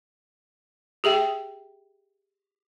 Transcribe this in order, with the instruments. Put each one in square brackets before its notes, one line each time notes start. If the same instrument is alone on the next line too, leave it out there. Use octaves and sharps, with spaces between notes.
[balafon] G4 G#4 E5 G5